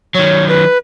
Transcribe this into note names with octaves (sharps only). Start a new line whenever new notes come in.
D#3 F#3 C#5
B4